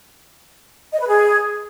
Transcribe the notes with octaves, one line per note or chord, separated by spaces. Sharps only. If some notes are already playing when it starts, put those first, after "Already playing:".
D#5
B4
G#4